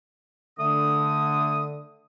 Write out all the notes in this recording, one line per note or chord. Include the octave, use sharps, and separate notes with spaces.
D3 A3 D#6